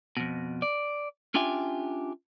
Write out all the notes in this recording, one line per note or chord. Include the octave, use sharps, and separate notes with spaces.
F2 B2
D5
C#4 D4 F4 G4 E5 G#5